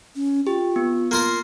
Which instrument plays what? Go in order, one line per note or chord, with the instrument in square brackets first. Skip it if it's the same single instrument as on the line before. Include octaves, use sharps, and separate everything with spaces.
[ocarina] C#4
[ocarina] F4 [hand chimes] G4
[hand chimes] B3
[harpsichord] A#3 F4 A#4